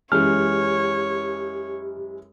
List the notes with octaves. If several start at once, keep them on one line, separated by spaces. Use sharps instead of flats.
F#2 E3 G#3 G4 C#5 F6